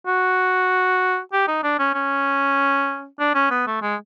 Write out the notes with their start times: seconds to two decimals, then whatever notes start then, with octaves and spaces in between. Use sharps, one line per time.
0.07 F#4
1.33 G4
1.48 D#4
1.63 D4
1.79 C#4
1.94 C#4
3.20 D4
3.35 C#4
3.51 B3
3.67 A3
3.82 G#3